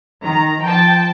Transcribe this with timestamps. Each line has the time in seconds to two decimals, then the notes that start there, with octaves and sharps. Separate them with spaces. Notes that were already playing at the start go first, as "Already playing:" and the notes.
0.22 D#3 A#5
0.62 F3 G5 A5